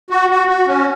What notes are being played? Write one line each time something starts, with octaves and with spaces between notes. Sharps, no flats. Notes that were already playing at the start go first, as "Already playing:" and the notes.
F#4
F#4
F#4
C#4